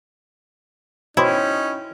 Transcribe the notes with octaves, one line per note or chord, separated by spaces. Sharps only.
B2 C#4 D#4 E4 C5 C#5 D#5 G5